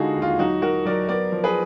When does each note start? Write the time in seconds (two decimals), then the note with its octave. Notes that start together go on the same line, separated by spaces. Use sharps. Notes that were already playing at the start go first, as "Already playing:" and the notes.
Already playing: D3 G#3 D#4 F4 F#4 G#4
0.16 D#2
0.22 F4
0.39 F#3 D#4 F#4
0.62 F#3 F#4 A#4
0.85 F#3 A#4 D5
1.09 B3 A#4 D5
1.32 F3
1.44 G#4 B4